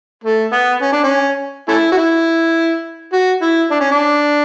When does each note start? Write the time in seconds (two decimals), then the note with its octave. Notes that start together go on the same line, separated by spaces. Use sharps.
0.24 A3
0.52 B3
0.82 C#4
0.92 D4
1.04 C#4
1.68 A3 C#4 E4
1.92 F#4
1.97 E4
3.13 F#4
3.42 E4
3.71 D4
3.81 C#4
3.91 D4